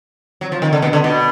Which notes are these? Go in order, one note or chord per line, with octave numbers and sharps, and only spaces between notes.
F#3
F3
D#3
D3
B2
D3
B2